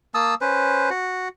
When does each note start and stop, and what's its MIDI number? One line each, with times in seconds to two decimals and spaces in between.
0.14 0.35 58
0.14 0.35 81
0.14 0.35 87
0.14 0.35 88
0.41 0.90 61
0.41 0.90 71
0.41 0.90 72
0.90 1.28 66